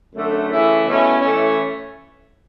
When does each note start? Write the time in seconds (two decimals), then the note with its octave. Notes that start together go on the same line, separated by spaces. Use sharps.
0.14 F#2 D3 A3
0.50 C#3 E3 A3 E4
0.85 B2 A3 C#4 E4
1.21 A2 E3 A3 C#4